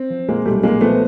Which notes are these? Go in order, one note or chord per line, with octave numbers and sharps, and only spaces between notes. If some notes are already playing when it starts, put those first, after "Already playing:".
Already playing: C4
F3
A#2 G#3 A#3
B1 G3 A3
A#2 G#3 A#3
F3 A3 B3